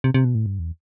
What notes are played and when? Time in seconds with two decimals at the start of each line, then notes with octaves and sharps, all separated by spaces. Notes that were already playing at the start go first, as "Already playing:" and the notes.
0.04 C3
0.14 C3
0.25 B2
0.35 A2
0.46 G2
0.59 E2